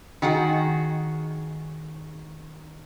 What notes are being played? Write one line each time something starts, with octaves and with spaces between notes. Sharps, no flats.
D#3 F#4 G#4 F#5